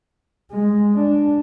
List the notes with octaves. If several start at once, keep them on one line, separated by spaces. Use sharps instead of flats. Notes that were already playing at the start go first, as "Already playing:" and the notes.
G#3
D4